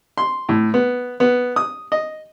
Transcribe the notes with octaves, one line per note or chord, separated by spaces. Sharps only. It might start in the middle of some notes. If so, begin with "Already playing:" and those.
C6
A2
B3
B3
D#6
D#5